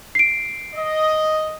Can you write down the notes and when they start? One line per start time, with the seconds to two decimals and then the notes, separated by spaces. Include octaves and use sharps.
0.15 C7 D7
0.75 D#5